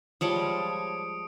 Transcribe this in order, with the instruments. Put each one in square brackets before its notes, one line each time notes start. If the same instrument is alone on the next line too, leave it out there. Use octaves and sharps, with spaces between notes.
[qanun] F3 G3 G#3 [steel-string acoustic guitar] C#5 A5 [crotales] D#6 C#7 D7